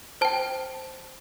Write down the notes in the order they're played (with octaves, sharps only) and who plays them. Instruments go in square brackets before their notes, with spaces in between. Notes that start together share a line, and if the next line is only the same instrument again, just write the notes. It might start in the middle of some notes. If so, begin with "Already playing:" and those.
[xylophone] C5 G5 A5